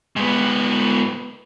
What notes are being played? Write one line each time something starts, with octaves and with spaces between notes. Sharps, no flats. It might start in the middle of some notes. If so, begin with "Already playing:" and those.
G#2 B3